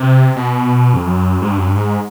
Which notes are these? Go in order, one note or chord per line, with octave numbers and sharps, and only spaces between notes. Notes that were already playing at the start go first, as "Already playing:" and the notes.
Already playing: C3
B2
F2
F#2
G#2
G2
F#2
G2
G#2